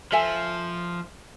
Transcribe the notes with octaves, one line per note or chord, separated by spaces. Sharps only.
F3 A4 E5 G#5